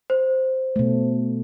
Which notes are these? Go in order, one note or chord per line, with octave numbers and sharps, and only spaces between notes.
C5
B2 A3